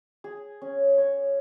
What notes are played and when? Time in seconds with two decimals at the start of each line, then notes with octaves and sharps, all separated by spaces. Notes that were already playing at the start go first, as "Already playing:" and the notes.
0.24 G#4
0.62 C#4
0.98 C#5